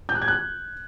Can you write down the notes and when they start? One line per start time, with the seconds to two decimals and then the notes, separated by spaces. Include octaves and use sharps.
0.09 G6
0.15 F#6
0.22 G#6
0.28 F#6